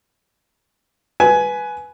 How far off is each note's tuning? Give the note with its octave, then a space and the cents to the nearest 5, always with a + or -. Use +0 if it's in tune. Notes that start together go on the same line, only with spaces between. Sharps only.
B4 +0 G#5 +15